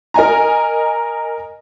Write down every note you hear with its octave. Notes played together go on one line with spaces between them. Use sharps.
A#4 D#5 G#5 A#5